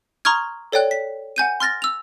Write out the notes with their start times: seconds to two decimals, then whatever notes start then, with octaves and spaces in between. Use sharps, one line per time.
0.25 A#5 C6 C#6 D#6 F6 G#6
0.72 A4 C#5 D5 G5 F#6
0.91 B6
1.36 F#5 G#5 G6 D#7
1.60 C6 F6 A6 A#6
1.82 E6 F7